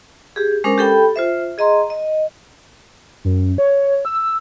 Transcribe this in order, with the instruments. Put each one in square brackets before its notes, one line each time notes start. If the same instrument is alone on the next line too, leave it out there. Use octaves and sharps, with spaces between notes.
[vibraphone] G4 G#4
G#3 C#4 D4 A#4 C5 D#6
G4 A4 G5 B5
F4 C5 E5
G#4 D#5 A#5 C6
D#5
[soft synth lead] F#2
C#5
E6